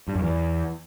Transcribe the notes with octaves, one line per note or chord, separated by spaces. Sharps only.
G2
F#2
E2